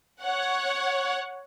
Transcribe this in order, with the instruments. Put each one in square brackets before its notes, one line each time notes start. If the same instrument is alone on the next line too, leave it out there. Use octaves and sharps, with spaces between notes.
[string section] C#5 F#5